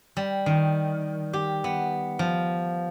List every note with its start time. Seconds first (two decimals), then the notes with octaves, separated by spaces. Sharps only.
0.17 G3
0.46 D#3
1.33 G4
1.64 B3
2.19 F3